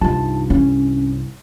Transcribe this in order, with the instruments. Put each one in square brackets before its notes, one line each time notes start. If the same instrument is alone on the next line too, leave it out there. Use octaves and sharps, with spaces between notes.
[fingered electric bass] C2 G2 [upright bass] D#4 F4 [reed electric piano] A5
[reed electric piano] C#4 [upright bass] E4